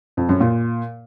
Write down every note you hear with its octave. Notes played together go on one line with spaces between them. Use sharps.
F2
F#2
A#2